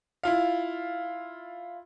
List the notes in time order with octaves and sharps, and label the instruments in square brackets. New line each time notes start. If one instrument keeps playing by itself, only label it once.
[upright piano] E4 F4 F5